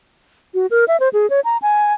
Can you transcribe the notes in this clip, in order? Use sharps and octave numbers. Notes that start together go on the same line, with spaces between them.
F#4
A#4
E5
C5
G#4
C#5
A#5
G#5